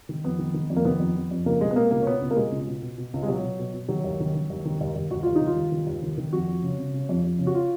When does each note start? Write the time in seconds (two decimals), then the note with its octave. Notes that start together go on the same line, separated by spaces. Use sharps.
0.09 D#3
0.24 F2 B3
0.39 D#3
0.54 D#3
0.70 F2
0.76 A#3
0.85 D#3 B3
1.00 F2
1.16 F2
1.31 F2
1.46 C#2 A#3
1.61 B2 G#3
1.71 B3
1.76 B2 A#3
1.91 C#2 A#3
2.02 C#4
2.06 B2 B3
2.21 C#2
2.31 A#3
2.36 B2 G#3
2.52 C#2
2.67 B2
2.83 B2
2.98 B2
3.14 C#2
3.23 G#3
3.28 B2 F#3
3.44 B2
3.59 B2
3.74 B2
3.89 D#3 F#3
4.04 D#2
4.20 D#3
4.35 D#3
4.50 D#2
4.65 D#3
4.81 D#2
4.96 D#2
5.11 D#2 F#4
5.23 D#2 F4
5.36 D#4
5.42 D#3
5.47 F4
5.57 D#2
5.72 D#3
5.87 D#2
6.02 D#3
6.18 D#3
6.33 F2 F#4
6.48 F2
6.63 C#3
6.78 C#3
6.94 C#3
7.09 F2
7.24 F2
7.39 C#3
7.47 F#4
7.55 F4